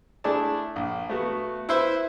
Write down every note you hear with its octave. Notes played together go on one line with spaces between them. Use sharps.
A3 D4 E4 G#4 D5 A5
A#1
A3 B3 F#4
E4 B4 C5 E5